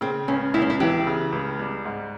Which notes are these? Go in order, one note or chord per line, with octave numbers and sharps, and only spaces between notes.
C#3 C4
C#2 C#4
C#2 E4
C#4
E4
E3 G4
C#3
C#2
G3
G#2